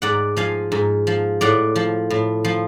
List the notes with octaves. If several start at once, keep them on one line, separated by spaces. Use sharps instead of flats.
G#2 D5 F#5
F3 F5 G#5
G#2
F3
A2 D5 F#5
F3
A2
F3